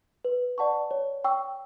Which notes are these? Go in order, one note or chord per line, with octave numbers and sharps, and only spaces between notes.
B4
D5 F#5 A5 C#6
C#5
G5 C#6 E6